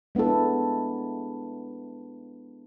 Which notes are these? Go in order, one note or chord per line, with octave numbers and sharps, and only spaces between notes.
G#3 B3 D4 E4 A4